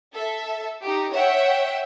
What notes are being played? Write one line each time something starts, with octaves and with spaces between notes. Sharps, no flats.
A4 E5
D#4 G4
C#5 E5 F#5 G5